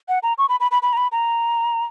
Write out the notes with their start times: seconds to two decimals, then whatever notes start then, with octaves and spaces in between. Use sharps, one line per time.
0.09 F#5
0.23 A#5
0.38 C#6
0.49 B5
0.60 B5
0.71 B5
0.83 B5
0.93 A#5
0.97 B5
1.12 A#5